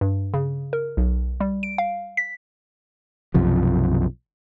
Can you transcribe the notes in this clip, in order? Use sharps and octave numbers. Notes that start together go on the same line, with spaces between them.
G2
C#3
A#4
B1
G3
D7
F5
B6
B1 F#2 C3 F3